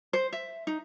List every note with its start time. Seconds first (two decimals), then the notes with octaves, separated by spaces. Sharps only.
0.13 C5
0.33 E5
0.67 D#4